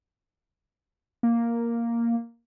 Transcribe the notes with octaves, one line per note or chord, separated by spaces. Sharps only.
A#3